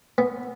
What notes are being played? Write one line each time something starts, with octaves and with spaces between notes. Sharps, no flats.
B3